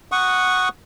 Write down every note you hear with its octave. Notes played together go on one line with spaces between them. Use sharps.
F#5 C#6 D#6